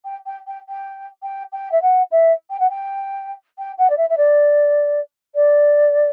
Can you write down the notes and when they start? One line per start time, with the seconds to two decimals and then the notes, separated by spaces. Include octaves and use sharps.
0.05 G5
0.26 G5
0.47 G5
0.69 G5
1.23 G5
1.52 G5
1.72 E5
1.82 F#5
2.11 E5
2.50 G5
2.60 F#5
2.70 G5
3.59 G5
3.78 F#5
3.90 D5
3.97 E5
4.09 E5
4.17 D5
5.35 D5